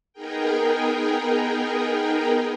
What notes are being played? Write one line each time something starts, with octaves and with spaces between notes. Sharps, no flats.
B3 D#4 G#4 A#4 G5